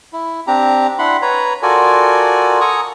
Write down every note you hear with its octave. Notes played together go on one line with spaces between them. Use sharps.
E4
C4 D4 G4 A#5
D4 E4 F#5 B5 C6
B4 C#5 A#5
F4 F#4 A4 A#4 D5 G#5
A4 G#5 A#5 C#6 D#6